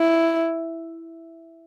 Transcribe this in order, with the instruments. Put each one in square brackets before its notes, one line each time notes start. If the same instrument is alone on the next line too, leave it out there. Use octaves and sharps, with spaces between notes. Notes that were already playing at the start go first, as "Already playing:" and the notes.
Already playing: [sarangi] E4